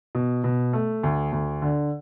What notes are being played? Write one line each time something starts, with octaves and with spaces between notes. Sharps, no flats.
B2
B2
A3
D2
D2
D3